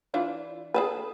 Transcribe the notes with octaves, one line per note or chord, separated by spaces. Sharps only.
E3 D4 F4
G#4 A4 B4